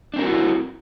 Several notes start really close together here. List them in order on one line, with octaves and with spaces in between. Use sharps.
D4 C4 A#4 F#4 E4